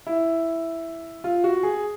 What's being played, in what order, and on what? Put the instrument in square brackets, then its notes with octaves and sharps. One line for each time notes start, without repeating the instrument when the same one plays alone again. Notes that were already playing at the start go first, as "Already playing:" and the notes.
[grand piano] E4
F4
F#4
G#4